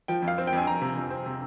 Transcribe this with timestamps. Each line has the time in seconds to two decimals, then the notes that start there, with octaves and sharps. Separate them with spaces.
0.08 F3 G5
0.22 F2
0.28 F5
0.38 C4
0.47 G5
0.52 F2
0.58 G#5
0.67 F2 A#5
0.82 C3
0.96 F2
1.10 C4
1.26 C3